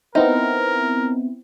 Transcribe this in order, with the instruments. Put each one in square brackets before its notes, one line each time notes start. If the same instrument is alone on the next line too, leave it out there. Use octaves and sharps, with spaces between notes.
[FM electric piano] B3 C4 E4 [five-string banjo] D#4 [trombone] A#4